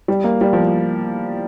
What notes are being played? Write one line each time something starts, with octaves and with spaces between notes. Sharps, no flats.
G3
A#3
G3
F3